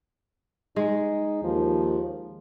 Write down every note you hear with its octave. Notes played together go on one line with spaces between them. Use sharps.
G#3 D#4
D#2 F3